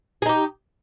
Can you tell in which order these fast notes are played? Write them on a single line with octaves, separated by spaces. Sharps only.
G#4 D#4 G4